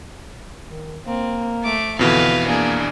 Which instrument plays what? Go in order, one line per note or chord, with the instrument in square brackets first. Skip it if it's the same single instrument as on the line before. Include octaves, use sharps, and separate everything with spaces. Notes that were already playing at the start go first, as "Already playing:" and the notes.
[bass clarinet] D#3
[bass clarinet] A#3 [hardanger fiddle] C4
[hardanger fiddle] A3 D6
[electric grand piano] F2 B2 E3 [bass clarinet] D3 [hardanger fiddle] B4 F5
[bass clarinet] A#3 [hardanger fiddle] D4 G#4